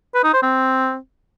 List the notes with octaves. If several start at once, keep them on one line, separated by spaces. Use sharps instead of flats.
B4
D#4
C5
C4